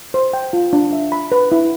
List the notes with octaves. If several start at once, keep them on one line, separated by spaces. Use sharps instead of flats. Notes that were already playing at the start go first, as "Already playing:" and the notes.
C5
G5
F4
D4
E5
B5
B4
E4